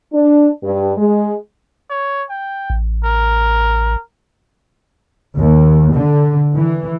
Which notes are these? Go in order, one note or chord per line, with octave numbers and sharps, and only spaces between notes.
D4
G2
G#3
C#5
G5
A1
A#4
D#2
D3
E3